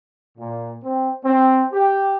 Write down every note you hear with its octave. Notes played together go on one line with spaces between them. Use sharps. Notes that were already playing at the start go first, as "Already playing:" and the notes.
A#2
C4
C4
G4